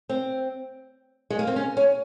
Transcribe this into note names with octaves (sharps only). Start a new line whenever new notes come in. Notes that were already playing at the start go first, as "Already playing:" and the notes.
C4
G#3
A#3
C4
C#4
C#4